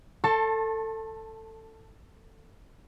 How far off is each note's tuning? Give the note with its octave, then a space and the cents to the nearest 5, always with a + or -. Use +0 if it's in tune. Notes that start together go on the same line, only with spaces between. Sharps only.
A4 +20 A5 +0 C#6 -45